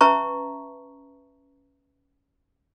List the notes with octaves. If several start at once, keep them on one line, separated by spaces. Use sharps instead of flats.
C#4 B4 E5 A5 A#5 C#6